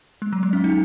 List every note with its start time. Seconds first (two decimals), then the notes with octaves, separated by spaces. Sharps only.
0.22 G#3
0.33 F#3
0.43 G#3
0.53 C#4
0.64 D#4